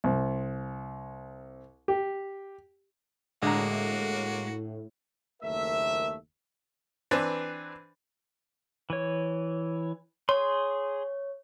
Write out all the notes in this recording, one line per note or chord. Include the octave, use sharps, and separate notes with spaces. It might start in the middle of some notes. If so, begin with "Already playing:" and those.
C2
G4
A2 D3 G#3 A#3 F#4 A#5
F#1 D#2 A3 A#4 E5
E3 C4 D4 B4
E3 C#5
G#4 C#5 C6